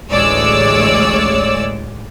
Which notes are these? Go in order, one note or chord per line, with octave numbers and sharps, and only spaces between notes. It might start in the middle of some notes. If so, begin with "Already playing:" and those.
A1 D2 G#3 C#5 D5 E6